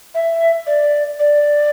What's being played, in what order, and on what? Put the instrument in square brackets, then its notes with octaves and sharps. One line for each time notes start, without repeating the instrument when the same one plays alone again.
[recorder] E5
D5
D5